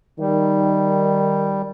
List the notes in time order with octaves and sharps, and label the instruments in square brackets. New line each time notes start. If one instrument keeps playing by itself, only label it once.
[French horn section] D#3 [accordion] G3